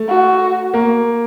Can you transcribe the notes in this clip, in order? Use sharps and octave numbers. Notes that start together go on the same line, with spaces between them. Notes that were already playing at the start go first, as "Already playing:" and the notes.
Already playing: A3
F#4
A#3